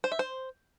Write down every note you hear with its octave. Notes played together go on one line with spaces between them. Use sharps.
C5
E5
C5